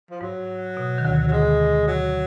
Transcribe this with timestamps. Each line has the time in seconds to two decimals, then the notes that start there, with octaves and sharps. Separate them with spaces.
0.11 F3
0.21 G#2 F#3
0.77 B2
0.98 D#3
1.05 D2 D3
1.27 F#3
1.32 D2 D3 G#3
1.87 F#3